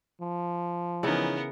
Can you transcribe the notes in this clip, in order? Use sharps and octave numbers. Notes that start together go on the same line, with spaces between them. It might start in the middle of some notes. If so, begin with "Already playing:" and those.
F3
C#3 E3 B3 C#4 D#4 E4 A#4